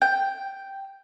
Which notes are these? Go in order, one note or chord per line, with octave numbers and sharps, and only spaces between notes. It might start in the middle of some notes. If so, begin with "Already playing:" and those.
G5